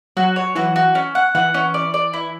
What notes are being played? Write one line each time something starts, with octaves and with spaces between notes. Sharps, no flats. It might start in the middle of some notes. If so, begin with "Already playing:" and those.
F#3 F#4
C#5
E3 F#4
F#4
C#4
F#5
E3 F#5
C#4
D5
D5
E4